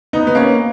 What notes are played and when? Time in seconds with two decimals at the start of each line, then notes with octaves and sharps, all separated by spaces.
0.13 B3 D#4
0.27 B3
0.35 A#3 C#4